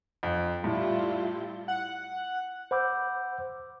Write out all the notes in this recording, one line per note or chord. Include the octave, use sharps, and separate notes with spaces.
F2
A2 G3 E4 F4 G4
F#5
C5 F#5 B5 D6 E6 G6